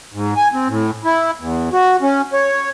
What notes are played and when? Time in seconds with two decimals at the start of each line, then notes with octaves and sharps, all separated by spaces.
0.14 G#2
0.36 G#5
0.54 C4
0.68 A2
1.05 E4
1.40 E2
1.73 F#4
2.02 C#4
2.33 C#5